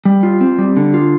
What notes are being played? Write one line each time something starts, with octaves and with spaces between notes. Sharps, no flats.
G3
F4
C4
G3
D3
F4